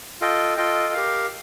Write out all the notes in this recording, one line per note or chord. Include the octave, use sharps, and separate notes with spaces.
F4 A4 D#5 G5
F4 A4 D#5 G5
G4 A#4 F5